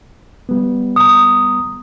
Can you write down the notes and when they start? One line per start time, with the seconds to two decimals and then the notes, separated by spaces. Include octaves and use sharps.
0.49 G3 B3
0.96 A#5 D#6